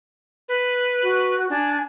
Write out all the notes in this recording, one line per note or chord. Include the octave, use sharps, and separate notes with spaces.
B4
F#4
D4 G#5